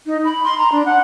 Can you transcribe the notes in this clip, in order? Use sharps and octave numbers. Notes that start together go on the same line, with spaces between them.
D#4
B5
C6
A#5
D4
F#5